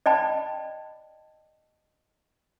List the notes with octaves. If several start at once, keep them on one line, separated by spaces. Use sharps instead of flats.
D5 D#5 G5 A5 B5